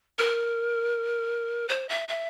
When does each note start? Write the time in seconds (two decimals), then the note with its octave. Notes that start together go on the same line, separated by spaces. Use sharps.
0.19 A#4
1.69 C5
1.89 E5
2.08 E5